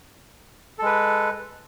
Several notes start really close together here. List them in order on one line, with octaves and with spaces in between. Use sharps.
A4 G#3 B4